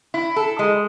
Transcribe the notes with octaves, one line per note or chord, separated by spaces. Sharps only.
E4
A4
G#3